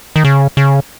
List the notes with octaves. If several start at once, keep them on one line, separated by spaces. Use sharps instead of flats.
D#3
C#3
C#3